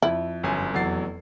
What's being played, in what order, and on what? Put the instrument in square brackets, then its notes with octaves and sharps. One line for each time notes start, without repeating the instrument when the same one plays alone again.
[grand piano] F2 [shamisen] E4
[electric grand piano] G1 F#2 G#5
[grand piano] F1 E2 C7 [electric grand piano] F#3 A6